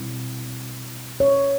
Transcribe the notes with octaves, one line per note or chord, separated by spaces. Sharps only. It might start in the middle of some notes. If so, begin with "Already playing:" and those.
Already playing: B2 G3 C4 E4
C#5